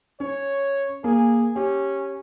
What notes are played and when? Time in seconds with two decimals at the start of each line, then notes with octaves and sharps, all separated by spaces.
0.20 C#4 C#5
1.04 A#3 G#4
1.56 C#4 G4